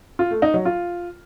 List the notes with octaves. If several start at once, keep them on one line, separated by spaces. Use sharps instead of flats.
F4
A3
D#4
F#3
F4